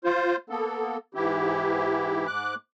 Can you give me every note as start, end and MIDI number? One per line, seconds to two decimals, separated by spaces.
0.04 0.36 65
0.04 0.36 72
0.50 0.97 58
0.50 0.97 59
0.50 0.97 69
1.14 2.27 44
1.14 2.27 52
1.14 2.27 64
1.14 2.27 67
2.27 2.55 44
2.27 2.55 86
2.27 2.55 90